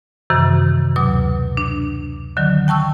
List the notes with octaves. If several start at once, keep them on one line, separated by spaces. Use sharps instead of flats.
F#2 C3 D#3 E3
D2 B2 F#3 D6
D4
D3 D#3 F#3
G5 A5 C#6 E6